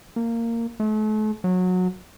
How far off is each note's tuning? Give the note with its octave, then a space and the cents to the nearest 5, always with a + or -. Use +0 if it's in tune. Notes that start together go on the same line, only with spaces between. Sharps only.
A#3 -15
A3 -40
F#3 -20